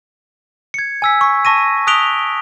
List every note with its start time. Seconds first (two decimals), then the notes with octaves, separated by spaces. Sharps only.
0.74 G#6 C#7
1.02 G#5 E6 B6
1.21 C#6 B6
1.45 A5 C#6 A#6 D#7
1.87 D#6 F#6 B6 D7 F7 G7